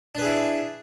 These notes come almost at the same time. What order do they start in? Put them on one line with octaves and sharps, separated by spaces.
D4 B4 G#4 E4